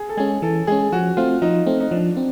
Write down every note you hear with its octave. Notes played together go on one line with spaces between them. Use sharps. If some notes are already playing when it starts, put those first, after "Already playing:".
Already playing: G#4
A4
G#3 C#4 G#4
E3 A4
G#3 C#4 G#4
F3 F#4
A3 C4 F4
F3 D#4
A3 C4
D#4
F3 D4
C4